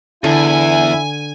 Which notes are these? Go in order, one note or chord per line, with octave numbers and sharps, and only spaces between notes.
E2 D3 E4 G#5